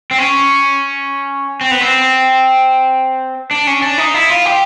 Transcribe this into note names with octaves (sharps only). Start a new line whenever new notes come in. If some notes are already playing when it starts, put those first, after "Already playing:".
C4
C#4
C4
B3
C4
D4
C#4
D4
D#4
E4
F4
G4